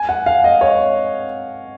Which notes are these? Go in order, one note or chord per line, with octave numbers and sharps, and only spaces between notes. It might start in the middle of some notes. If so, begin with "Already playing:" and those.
Already playing: G#5
F#5
F5
D#5
C#5